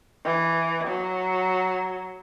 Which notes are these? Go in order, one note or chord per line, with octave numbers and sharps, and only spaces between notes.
E3
F#3